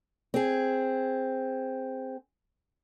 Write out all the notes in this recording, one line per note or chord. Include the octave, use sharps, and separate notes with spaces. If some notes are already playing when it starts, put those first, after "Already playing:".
C4 G#4